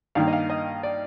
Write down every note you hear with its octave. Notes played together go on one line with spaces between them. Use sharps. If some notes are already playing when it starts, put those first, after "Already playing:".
G2 D#3 A#3 F5
D#5
F5
D#5
D5